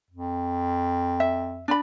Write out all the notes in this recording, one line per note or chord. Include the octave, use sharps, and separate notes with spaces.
F2
E5
D4 D5 B5